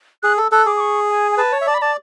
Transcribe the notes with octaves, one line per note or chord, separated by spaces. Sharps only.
G#4 F#6
A4 E6
A4 F#6
G#4 D6
D6
C#6
G#5
G#5
B4 A5
C#5
E5
D5 A5
B5
D5 A5